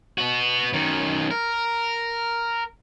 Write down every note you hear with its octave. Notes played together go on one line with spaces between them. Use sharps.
B3 F#4
F#2 D#3
A#4